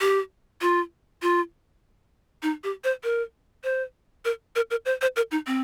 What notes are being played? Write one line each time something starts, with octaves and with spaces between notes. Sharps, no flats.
G4
F4
F4
D#4
G4
C5
A#4
C5
A#4
A#4
A#4
C5
C5
A#4
D#4
C4